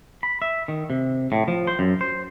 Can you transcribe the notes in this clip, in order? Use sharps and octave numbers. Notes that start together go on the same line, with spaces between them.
B5
E5
D#3
C3
A2
F3
C5
F#2
C5